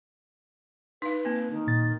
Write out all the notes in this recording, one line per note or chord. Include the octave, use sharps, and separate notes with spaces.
D#4 B4 F5
A#3 C4
D#3
A#2 A6